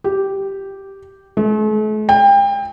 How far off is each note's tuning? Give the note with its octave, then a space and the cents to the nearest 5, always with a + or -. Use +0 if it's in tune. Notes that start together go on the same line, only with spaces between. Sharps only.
G4 -5
A3 -45
G5 +30